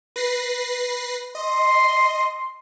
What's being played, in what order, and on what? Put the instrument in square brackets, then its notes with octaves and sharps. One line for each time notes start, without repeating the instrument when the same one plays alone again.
[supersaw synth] B4 A#6 C7
[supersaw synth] D#5 [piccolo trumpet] C6